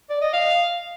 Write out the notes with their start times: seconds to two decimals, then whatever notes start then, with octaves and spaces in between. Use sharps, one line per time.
0.09 D5
0.21 D#5
0.33 F5